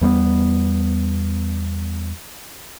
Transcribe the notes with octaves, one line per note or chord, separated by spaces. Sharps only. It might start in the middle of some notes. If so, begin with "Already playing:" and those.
E2 G3 A3 B3